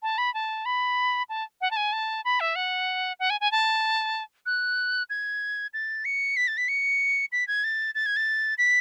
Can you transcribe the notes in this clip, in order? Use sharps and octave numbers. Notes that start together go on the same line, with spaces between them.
A5
B5
A5
B5
A5
F#5
A5
G#5
A5
B5
E5
F#5
F#5
G#5
G#5
A5
F#6
G#6
A6
C#7
B6
A6
B6
C#7
B6
G#6
A6
A6
G#6
A6
B6